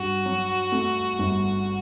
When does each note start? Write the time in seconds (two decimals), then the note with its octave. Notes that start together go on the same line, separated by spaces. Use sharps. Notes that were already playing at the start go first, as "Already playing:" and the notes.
Already playing: G2 F#4
0.26 F#3
0.72 A3
1.19 G1